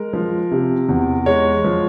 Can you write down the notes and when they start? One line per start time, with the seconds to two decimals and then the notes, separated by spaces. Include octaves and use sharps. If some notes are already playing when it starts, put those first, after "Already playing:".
Already playing: G#3 A#4
0.13 F3
0.51 C3
0.88 E2
1.26 G#3 C#5
1.64 F3